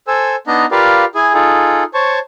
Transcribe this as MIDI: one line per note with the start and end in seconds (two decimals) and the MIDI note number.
0.08 0.36 69
0.08 0.36 72
0.08 0.36 80
0.08 0.36 88
0.47 0.66 59
0.47 0.66 62
0.47 0.66 63
0.47 0.66 75
0.47 0.66 82
0.71 1.05 65
0.71 1.05 67
0.71 1.05 70
0.71 1.05 71
0.71 1.05 74
0.71 1.05 77
1.15 1.33 64
1.15 1.33 68
1.15 1.33 80
1.34 1.84 63
1.34 1.84 65
1.34 1.84 68
1.34 1.84 69
1.94 2.19 72
1.94 2.19 73
1.94 2.19 81
1.94 2.19 85